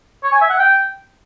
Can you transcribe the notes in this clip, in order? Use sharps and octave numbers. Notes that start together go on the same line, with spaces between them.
C#5
G#5
E5
F#5
G5